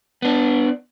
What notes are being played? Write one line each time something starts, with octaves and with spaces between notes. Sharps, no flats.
B3 D4